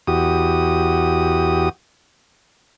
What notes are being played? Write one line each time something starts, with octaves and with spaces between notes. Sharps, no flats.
E2 F#4 G4 D#6